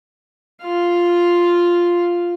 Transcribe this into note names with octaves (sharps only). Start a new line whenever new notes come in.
F4 F5